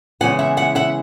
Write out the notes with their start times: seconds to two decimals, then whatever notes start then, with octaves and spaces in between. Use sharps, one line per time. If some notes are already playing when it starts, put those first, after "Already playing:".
0.21 C#3 E3 G#3 B3 F#5 G#5
0.39 E5 F#5
0.57 E5 F#5
0.75 E5 F#5